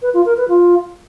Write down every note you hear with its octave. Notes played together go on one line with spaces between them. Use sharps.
B4
F4
A#4
B4
F4